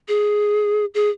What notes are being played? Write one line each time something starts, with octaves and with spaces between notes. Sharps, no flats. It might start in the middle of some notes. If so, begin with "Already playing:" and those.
G#4
G#4